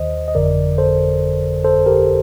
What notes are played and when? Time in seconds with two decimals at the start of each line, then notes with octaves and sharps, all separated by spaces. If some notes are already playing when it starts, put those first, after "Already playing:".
Already playing: D#2 D#3 C5 D#5
0.28 D#5
0.35 G1 F2 D3 A#4 D5
0.78 A4 C5
1.64 A4 C5
1.86 G4 A#4